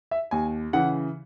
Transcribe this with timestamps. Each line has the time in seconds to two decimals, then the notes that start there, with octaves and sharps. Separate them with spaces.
0.11 E5
0.31 D#2 G#5
0.73 C#3 E3 F#5